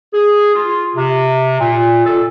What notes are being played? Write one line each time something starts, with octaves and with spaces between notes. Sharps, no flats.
G#4
F4
C3
A#2
A4